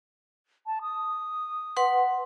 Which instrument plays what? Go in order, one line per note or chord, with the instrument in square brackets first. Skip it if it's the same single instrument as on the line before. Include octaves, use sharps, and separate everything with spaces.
[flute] A5
D#6
[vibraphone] B4 F#5 C6